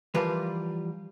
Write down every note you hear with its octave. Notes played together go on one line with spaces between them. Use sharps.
E3 F3 G3 F4 A#4 B4